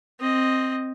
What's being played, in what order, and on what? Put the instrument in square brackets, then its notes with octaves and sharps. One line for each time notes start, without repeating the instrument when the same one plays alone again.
[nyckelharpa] C4 D#5